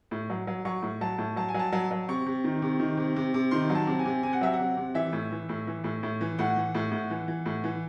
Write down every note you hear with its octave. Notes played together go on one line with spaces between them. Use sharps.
A2
F#3
F#3
F#3 C#6
A2
F#3 A5
A2
F#3 A5
G#5
F#3
A5
F#3
F#3
C3 C#6
C3
D#3
C3
D#3
C3
C3
C3
D#3 C6
F#3
A5
C3
G#5
C3
C3 G#5
F#5
F#3 E5
F#5
C3
C3
E3 E5
A2
E3
A2
E3
A2
A2
E3
A2 F#5
E3
A2
A2
E3
E3
A2
E3